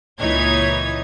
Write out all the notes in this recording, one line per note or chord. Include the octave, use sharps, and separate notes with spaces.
C#2 A#2 E3 D#4 C#5 G#6